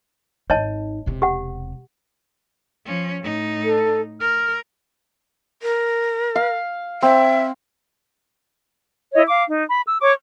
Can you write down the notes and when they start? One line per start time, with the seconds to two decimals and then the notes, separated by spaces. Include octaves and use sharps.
0.50 G#1 D#4 C#5 D#5 A5
1.06 E1 C3
1.22 G4 F#5
2.86 F3 C#4
3.23 A2 D#4
3.65 A4
4.21 A#4 F6
5.63 A#4
6.36 F5
7.02 C4 E5
9.14 E4 C#5 D#5
9.28 F5 D6
9.48 D#4
9.69 B5
9.87 E6
10.01 C#5 C#6 D6